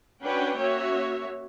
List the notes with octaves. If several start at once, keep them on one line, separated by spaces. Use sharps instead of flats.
C#4 D4 F#4 B4 F#5 G5
A#3 C#4 F#4 C#5 E5